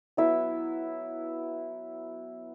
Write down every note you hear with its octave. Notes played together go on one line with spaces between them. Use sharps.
F#3 B3 E4 E5